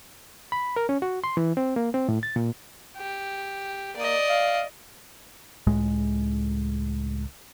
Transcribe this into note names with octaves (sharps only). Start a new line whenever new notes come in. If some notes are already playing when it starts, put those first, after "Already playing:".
B5
A#4
C#4
F#4
C6
E3
C4
A#3
C4
A2
A6
A#2
G4
A#3 D5 D#5
F5
C#2 A2 G#3